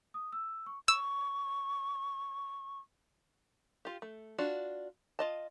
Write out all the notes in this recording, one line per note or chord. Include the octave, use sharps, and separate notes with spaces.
D#6
E6
C#6
C#6 E6
F4 G4
A3
D4 F4 F#4
F4 D#5 A5